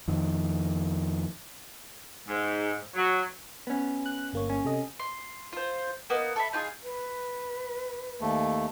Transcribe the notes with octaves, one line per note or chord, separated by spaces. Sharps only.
F2 D#3
G#2
F#3
B3 C#4
F#6
G1 A#3 C#5
C#4
C3 A4 D#5
C6
F4 C5
A#3 B3 D#4
A4 E5 B5
D#4 F4 G4 G#4
B4
D#2 A3